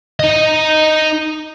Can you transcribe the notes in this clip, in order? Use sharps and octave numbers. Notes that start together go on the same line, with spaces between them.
D#4 D#5